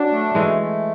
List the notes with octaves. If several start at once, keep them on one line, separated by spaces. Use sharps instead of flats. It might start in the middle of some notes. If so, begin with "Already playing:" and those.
Already playing: F#3 D4
A3
E3 G#3 A3
A3